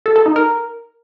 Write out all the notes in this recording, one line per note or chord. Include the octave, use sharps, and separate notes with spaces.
A4
A4
D#4
A#4